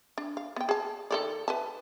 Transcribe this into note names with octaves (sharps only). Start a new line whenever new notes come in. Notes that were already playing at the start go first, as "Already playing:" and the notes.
D4
F5
B3 G5
G#4 A5
D#3 A4 D5
B4 E5 A5